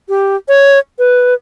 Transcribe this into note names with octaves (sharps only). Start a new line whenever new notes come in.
G4
C#5
B4